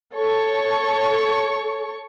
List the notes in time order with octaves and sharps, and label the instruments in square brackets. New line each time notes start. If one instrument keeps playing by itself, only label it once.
[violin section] A4 C#5 C#6